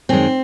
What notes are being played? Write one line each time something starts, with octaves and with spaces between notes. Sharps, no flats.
F#2 D#3 G#3 C4